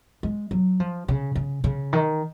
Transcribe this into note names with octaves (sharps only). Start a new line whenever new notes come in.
G#3
F#3
F3
C#3
C#3
C#3
D#3